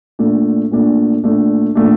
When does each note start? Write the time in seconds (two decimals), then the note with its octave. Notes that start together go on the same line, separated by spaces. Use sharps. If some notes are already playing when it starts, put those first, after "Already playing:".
0.19 A#2 A3 D4
0.71 A#2 A3 D4
1.24 A#2 A3 D4
1.75 A#2 A3 D4